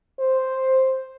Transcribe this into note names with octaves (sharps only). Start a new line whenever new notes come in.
C5